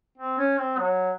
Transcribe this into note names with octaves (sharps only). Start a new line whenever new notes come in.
C4
C#4
C4
F#3